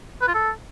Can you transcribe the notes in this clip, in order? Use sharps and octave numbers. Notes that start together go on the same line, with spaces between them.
B4
F4
A4